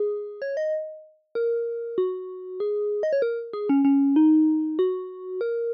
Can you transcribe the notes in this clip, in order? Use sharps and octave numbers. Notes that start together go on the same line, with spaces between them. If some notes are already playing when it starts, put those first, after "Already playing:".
Already playing: G#4
C#5
D#5
A#4
F#4
G#4
D#5
C#5
A#4
G#4
C#4
C#4
D#4
F#4
A#4